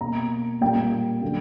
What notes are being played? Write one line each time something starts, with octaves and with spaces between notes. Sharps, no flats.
B2 A#3 A#5
A#2 G3 A#3 G5
D3 F#3 A#3